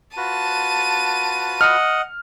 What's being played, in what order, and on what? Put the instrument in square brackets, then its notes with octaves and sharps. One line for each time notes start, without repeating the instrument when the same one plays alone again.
[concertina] F4 F#4 B4 [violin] A5 D#7
[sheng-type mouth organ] D#5 F#5 [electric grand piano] F6